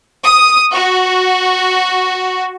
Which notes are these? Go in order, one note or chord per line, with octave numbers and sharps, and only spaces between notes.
D#6
F#4